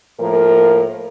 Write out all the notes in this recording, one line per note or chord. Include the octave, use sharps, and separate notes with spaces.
A2 F3 A#3 A#4